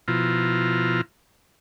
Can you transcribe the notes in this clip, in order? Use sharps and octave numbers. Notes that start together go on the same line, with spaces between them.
B2 F3 E4 F4 A#5